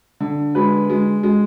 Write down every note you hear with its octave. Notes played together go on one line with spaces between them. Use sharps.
D3
G#3 B4
G#3
G#3